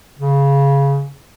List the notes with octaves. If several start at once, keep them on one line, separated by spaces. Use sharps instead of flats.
C#3